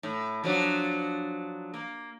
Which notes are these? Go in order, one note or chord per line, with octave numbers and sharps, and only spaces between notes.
A2
F3 F#3 D4
A#3